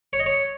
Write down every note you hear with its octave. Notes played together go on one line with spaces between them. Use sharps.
C#5
D#5
C#5